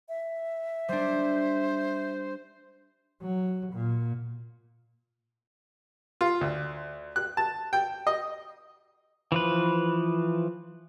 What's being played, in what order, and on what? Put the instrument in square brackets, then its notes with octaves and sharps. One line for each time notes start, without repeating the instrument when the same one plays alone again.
[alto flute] E5
[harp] G3 D4 [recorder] C5
[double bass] F#3
A#2
[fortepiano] F4
D2
F#6
A5
G5
D#5
[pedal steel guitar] E3 F3 B4